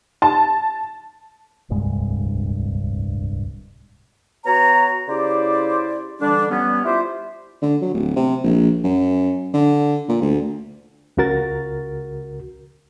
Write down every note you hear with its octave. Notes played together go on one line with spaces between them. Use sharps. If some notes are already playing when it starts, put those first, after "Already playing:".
A5
D1 C2 G2 G#3
B3 F#4 C#5 A#5
C#3 E4 G4 C5 D5
D3 E3 G3 D4
G3 B3 C#4
E4 F4 G4 C5 D5 E5
D3
F#3
D1
C3
A#1
F#2
D3
A#2
D2
C#2 C#3 F#4 A#4 A6